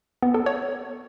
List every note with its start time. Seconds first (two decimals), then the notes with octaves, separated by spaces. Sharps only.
0.22 B3
0.34 A4
0.46 C#5